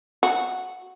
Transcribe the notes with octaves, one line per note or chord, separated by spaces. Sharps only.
F#4